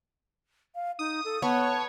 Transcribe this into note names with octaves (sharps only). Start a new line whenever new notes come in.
F5
D#4 D#6
A4
B3 C#5 A5